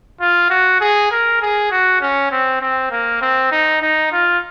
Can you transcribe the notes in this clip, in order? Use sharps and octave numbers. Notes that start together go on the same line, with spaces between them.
F4
F#4
G#4
A#4
G#4
F#4
C#4
C4
C4
A#3
C4
D#4
D#4
F4